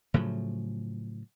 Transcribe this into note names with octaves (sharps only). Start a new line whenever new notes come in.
A2 C#3 F3 F#3